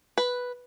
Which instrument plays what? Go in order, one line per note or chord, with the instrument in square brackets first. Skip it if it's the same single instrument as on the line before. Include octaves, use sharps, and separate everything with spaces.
[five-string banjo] B4